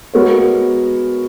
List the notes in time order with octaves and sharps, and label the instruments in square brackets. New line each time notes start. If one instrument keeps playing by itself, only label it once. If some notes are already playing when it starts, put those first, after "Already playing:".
[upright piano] G#3 B3 F#4 A#4 C#5